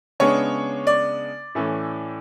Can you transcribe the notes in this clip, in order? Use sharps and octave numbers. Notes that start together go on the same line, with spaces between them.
C#3 G#3 B3 D4 C#5
D5
A2 E3 A3 C#4